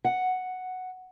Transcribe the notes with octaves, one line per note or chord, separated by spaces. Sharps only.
F#5